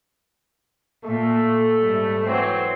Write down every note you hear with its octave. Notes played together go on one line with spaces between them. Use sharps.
A#2 A3
G#2 G3
E3 F#3 C4 C5